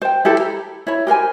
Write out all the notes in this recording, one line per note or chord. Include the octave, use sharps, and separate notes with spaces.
C5 G5
E4 G4 A4 C5
A#5
E4 C#5 B5
G4 A#4 C5 G#5